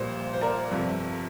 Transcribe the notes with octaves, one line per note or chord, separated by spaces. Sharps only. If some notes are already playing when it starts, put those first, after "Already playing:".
Already playing: A#1 A#2 G3 C5
C5
A#4 D5
G1 F2 C3 F3